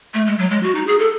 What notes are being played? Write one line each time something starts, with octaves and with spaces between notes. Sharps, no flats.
A3
G#3
F#3
G#3
F#4
D#4
G#4
A4